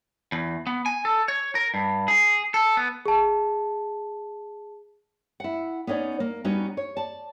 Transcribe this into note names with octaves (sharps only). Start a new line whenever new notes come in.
E2
B3
G#5
A4
C#5
A#4
G2
G#4
A4
B3
G#4 A5
E4 F#5
B3 C#4 D#4 C#5 D5
A#3
G3 B3 C#4 D#4 F#4
C#5
D5 A5